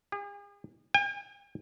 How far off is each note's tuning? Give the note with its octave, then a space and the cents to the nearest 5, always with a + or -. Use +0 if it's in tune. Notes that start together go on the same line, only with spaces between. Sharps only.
G#4 -45
G5 +45